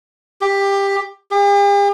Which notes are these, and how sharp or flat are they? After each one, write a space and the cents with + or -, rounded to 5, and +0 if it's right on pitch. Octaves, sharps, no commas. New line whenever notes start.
G4 +15
G4 +45